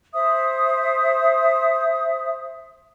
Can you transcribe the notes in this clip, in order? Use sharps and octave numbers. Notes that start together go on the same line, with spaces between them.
C5 E5 D#6